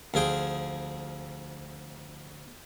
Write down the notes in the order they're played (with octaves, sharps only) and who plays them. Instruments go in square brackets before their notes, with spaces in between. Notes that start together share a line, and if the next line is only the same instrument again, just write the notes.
[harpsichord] D2 F3 G#4 G5